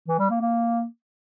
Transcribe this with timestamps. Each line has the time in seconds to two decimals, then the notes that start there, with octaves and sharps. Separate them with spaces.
0.08 E3
0.19 G3
0.30 A#3
0.41 A#3